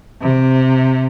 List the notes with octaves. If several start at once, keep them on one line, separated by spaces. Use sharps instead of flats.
C3